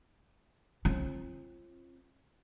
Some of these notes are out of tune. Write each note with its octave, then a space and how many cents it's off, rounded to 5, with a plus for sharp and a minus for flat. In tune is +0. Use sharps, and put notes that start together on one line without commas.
C4 +40 F4 -20